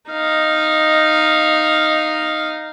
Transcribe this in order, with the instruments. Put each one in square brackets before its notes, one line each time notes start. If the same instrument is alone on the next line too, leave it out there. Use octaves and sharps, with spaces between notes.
[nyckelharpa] D#4 F5